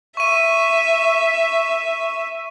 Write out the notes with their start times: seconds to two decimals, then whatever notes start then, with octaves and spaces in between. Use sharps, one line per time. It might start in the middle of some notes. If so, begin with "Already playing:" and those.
0.17 E5 C#6 D#7